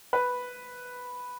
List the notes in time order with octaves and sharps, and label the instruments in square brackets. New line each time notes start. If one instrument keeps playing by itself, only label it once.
[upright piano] B4